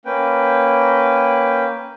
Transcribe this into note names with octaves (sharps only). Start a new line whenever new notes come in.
A#3 C#4 B4 G5